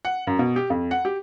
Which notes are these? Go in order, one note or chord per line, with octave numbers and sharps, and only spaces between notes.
F#5
F#2
B2
G4
F2
F#5
G4